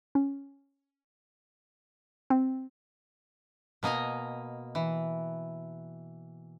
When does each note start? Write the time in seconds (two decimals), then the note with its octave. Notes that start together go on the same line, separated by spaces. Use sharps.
0.15 C#4
2.30 C4
3.83 B2 A#3 D#5 G#5 A#5
4.75 E3